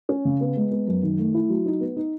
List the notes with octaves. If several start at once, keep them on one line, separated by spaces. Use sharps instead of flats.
C#4
C#3
B3
G#3
B3
F#2
D#3
A3
E4
F#3
D#4
B3
D#4